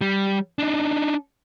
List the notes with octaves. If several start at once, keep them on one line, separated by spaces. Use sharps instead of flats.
G3
D4 D#4